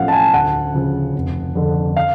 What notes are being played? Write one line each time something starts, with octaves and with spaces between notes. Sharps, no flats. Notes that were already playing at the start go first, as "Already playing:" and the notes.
Already playing: B1 A2 F3 A3 C#4 F5 F#5
A5
G#5
D2 F#5
C#3 F3
F1
F2 D3
F5